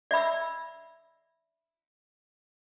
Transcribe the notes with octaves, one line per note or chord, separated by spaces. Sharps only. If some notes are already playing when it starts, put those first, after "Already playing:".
D5 E5 B5 E6